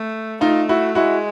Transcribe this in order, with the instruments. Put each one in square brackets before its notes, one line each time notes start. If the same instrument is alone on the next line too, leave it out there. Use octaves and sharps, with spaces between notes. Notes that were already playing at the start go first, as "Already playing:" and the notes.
Already playing: [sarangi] A3
[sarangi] A3 [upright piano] D#4 F4
[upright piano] E4 F#4
[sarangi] G#3 [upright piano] E4 F#4